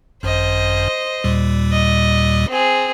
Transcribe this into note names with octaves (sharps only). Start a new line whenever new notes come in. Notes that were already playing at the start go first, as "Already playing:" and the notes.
G#1 F#2 C5 D#5
D#2 A#2 G3
D#5
C4 G#4